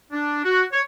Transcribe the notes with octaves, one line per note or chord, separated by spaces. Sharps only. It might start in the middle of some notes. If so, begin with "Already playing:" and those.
D4
F#4
C#5